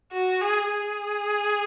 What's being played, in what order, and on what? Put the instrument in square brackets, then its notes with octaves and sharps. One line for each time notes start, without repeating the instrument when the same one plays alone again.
[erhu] F#4
G#4
G#4